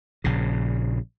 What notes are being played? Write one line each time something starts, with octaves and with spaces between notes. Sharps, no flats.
A#1 C#3